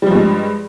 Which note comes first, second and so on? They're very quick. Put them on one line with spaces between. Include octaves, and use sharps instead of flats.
G3 F3 G2 G#3